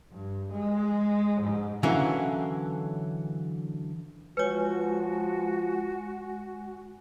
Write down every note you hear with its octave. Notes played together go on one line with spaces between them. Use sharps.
G2
G#3
G#2
D3 E3 F#3 A#3 C#4
F3 G#3 F#4 B4 C#5 G#5